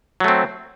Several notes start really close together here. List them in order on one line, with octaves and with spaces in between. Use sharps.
F#3 A3 C4